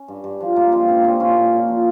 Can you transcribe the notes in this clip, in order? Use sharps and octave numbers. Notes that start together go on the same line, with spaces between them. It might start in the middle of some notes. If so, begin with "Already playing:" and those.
Already playing: C#4
G2
G2
F3
G2 A#3
F3 G#3 C4
G2 A#3 C#4
F3 C4 E4
A#2 C#4 F4
A#2
A#2
F3